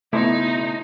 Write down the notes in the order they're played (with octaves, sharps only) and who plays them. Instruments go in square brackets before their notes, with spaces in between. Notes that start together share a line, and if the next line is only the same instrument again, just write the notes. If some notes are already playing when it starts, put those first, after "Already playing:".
[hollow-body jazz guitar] C#2 B2 [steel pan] A3 [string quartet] D#4 [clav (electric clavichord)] E4 C5